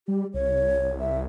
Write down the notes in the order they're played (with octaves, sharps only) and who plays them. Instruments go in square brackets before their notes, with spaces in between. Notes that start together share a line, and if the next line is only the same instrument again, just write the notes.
[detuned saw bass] G3 [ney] G4
[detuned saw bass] C2 [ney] C#5
[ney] E5